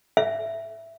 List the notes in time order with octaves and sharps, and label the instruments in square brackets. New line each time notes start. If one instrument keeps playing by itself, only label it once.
[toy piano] E5